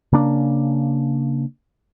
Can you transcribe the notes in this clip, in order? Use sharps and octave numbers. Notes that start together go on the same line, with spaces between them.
C#3 A#3 D4